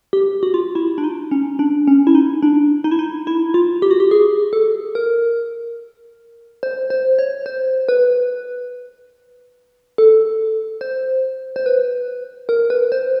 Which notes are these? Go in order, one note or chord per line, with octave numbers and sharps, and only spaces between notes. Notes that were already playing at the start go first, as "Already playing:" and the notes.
G4
F#4
F4
E4
D4
D#4
C#4
D4
C#4
E4
D#4
D4
D#4
E4
D#4
E4
F4
G4
F#4
G4
G#4
A4
A#4
C5
C5
C#5
C5
B4
A4
C5
C5
B4
A#4
B4
C5